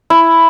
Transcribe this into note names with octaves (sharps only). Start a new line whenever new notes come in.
E4